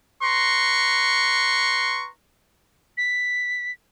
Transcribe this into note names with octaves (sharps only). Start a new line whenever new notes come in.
B4 A#5 C6 C#6
B6